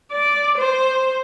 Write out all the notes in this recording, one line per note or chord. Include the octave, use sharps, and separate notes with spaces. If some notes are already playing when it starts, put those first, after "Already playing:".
D5
C5